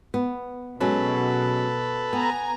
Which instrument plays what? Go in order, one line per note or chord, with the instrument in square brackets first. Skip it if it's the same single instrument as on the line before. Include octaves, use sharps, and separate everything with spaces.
[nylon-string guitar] B3
[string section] B2 [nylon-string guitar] F#3 G#3 C#4 [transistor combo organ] A4 B4
[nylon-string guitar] B3 [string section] G#5 A#5